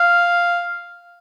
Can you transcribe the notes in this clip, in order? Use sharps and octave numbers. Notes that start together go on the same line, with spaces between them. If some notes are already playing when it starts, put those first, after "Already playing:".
Already playing: F5